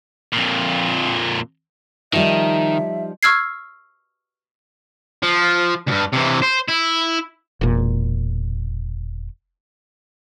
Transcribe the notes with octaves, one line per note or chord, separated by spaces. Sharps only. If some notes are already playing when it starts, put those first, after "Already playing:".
F2 A#2
D#3 F3 G3 D#4 E5
C#6 E6 F6 G#6 C7
F3
D2 G2
C3 E3
C5
E4
E1 A#2